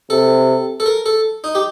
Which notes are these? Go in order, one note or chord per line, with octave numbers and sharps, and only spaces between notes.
C3 A4
A4
A#4
A4
D#4
G4